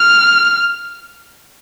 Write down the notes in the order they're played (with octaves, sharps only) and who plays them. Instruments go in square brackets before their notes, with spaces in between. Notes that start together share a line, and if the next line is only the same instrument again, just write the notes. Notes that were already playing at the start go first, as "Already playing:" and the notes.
Already playing: [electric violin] F6